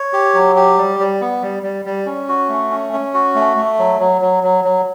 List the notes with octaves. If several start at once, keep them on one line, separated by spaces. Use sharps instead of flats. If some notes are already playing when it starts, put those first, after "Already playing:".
Already playing: C#5
G4
F#3
G4
G3
G3
B3
G3
G3
G3
C#4
F#4
A3
C#4
C#4
F#4
A3
A3
F#3
F#3
F#3
F#3
F#3